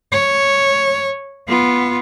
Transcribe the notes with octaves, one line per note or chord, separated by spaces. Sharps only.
C#5
B3 F4